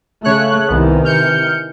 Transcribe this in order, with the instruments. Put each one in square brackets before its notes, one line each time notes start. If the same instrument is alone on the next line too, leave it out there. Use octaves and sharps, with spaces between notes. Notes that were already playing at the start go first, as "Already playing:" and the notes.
[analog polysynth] C#3 C#5 F#6 [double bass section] A3
[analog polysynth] C2 B3 [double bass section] C3 D#3 E3
[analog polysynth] F6 G6 C#7